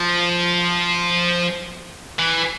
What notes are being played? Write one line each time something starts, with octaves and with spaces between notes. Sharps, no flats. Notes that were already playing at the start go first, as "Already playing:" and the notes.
Already playing: F3
E3